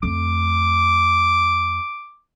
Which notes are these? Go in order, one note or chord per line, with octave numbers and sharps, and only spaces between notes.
F2 A3 D6